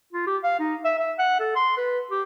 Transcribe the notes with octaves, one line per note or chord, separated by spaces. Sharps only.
F4
G4
F5
D#4
E5
E5
F#5
A4
C6
B4
G4